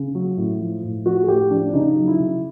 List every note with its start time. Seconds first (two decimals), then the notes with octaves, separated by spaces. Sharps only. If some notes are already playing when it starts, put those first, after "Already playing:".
Already playing: C#3
0.15 F#3
0.37 A2
0.60 F3
0.83 A2
1.05 F3 F#4
1.23 G#4
1.28 A2 G4
1.50 F3 D4
1.69 D4
1.74 C#3 D#4
1.96 F#3
2.08 E4
2.18 C#3